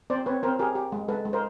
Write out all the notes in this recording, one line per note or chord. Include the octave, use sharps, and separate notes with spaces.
C4 C5 D5
C4 B4 C#5
C4 A#4 C5
G4 G#4 A#4
G4
G#3
G#3 A4 B4
G#3
A#4 C5